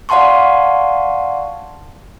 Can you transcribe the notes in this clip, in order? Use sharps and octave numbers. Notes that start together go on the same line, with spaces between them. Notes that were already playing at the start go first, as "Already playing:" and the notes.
D5 F5 F#5 A5 C6 C#6